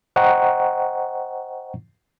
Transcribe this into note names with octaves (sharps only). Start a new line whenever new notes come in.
C5 D#5 F#5 G5 A#5 C#6